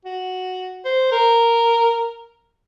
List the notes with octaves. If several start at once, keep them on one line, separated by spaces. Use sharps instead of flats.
F#4
C5
A#4